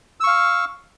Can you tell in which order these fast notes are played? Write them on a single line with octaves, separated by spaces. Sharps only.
E6 C#6 F5